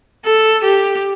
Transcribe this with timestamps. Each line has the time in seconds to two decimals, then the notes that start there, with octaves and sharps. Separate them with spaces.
0.24 A4
0.63 G4